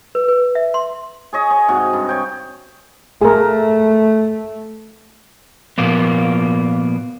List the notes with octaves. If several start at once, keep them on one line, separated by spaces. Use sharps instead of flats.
B4
B4
E5
C6
G#4 C#5 D#5
C#5
G#2 C3 F#4
G2
C#5 G5
A3 G#4 A#4
A#2 F3 A#3 B3